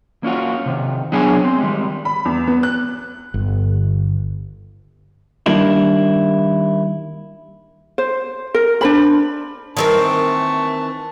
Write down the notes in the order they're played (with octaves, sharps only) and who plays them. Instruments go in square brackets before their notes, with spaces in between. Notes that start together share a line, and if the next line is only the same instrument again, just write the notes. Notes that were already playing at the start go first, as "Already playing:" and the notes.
[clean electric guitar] A#3 C#4 F4 F#4
C3 D#3
F#3 B3 D4 G#4 C#5 G#5
C4
D#3 G3 G#3
[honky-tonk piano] B5
E2
B3
F#6
[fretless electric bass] G1
[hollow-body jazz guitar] D#3 G3 A#3 D4 E4
[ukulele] C5
A#4
D4 C5 B5
[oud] D#3 C4 A#4 [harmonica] E3 A5 C#6